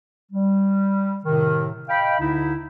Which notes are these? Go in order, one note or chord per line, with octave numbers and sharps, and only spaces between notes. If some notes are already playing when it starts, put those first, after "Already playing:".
G3
A2 C3 D#3
D#5 F5 G5 B5
D2 D3 D#4 E4